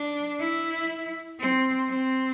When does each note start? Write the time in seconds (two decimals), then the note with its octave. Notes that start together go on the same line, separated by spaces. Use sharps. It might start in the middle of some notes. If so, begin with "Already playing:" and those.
Already playing: D4
0.40 E4
1.40 C4
1.89 C4